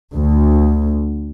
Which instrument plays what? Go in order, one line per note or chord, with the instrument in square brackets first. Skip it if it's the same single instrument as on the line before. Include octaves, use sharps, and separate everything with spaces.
[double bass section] D2